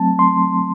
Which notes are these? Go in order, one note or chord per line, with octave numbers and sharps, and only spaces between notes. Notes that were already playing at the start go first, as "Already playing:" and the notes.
Already playing: F#3 A3 C4 A5
C6